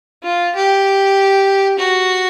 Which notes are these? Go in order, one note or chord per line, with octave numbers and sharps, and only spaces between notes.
F4
G4
F#4